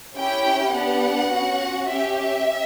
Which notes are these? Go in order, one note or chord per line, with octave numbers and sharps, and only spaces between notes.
C#4 E4 G4 G5
B3 D4 G4 F#5
C#4 F#4
C#4 G4 E5
E5